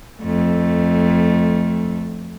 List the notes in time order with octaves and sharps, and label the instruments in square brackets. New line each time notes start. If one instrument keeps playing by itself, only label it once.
[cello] F2 A3